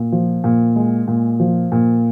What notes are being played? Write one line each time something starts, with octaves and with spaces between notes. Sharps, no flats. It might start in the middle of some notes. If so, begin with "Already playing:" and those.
Already playing: A#2
F3
A#2
G#3
A#2
F3
A#2